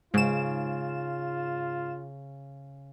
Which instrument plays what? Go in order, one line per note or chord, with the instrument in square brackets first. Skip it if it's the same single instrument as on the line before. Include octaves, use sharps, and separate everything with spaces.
[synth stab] G#2 E7 [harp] C#3 [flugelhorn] F4